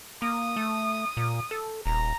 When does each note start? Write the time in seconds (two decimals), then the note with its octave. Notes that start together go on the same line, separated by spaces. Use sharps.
0.22 A#3 D#6
0.56 A3
1.17 A#2
1.51 A4
1.86 D#1 A#5